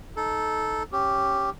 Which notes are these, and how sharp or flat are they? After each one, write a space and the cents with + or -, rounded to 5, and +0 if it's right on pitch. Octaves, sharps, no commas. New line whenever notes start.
D#4 +0 A4 -10
C#4 -10 G4 +0